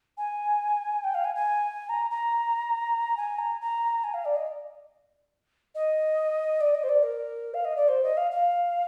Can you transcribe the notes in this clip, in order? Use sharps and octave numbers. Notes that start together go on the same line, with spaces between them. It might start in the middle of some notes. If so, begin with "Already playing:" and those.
G#5
G5
F5
G#5
G#5
A#5
A#5
G#5
A#5
A#5
G#5
F5
D5
D#5
D#5
D5
D#5
C5
D5
A#4
F5
D#5
D5
C5
D#5
F5
F5